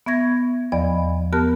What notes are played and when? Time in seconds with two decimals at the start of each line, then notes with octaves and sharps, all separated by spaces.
0.06 B3 E5 C#6 G#6 A#6
0.72 E2 F3 D5 D#5 B5
1.33 B3 G4 A#4 A5 F6 F#6